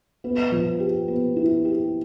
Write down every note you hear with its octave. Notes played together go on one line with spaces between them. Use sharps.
B3
F3
G4
B3
E4
G4